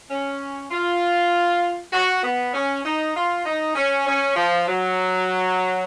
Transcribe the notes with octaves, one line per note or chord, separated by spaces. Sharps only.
C#4
F4
F#4
B3
C#4
D#4
F4
D#4
C#4
C#4
F3
F#3